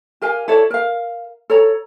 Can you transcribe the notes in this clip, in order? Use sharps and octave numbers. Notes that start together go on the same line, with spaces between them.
G4 A#4 F5 G#5
E4 A4 C#5 D5
A#4 F5
A4 C#5 A#5